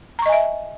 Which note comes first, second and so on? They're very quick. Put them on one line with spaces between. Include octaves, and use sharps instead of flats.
A#5 C#6 D#5 G#5 E5